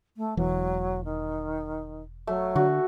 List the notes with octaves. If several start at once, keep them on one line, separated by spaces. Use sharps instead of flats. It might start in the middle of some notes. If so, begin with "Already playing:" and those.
A3
E1 E3 F#3
D#3
F#3 A3
D3 F#4